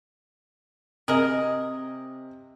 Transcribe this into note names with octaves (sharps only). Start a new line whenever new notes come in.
C3 G#4 A#4 D#5